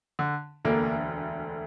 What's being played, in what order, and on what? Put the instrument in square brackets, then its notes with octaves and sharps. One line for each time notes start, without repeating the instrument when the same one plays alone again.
[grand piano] D3
[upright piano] E1 D2 D3 [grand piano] A#3